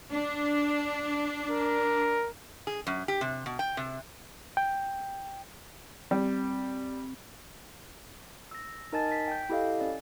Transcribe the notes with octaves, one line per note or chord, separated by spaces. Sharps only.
D4
A#4
G#4
F#2
G4
C3
B2
G5
C3
G5
G3 C4
E6 A#6
D#4 A#4 D#5 G#5 A5 A6
B6
G5 G6
E4 G4 A4 D#5 F5
C#4 D5